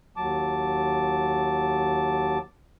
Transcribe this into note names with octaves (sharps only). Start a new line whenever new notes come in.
D#2 F#3 A5 D6